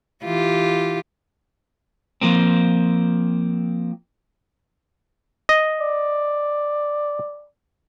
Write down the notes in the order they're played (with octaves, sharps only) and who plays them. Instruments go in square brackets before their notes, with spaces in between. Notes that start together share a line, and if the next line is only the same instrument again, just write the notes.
[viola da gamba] E3 F4 G4
[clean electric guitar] F3 A#3 C4
[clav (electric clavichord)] D#5
[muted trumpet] D5